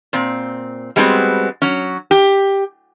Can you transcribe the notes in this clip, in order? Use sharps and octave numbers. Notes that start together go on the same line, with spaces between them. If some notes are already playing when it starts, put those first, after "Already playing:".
A#2 C4
G3 G#3 B3 C4 F#4
F#3 C#4
G4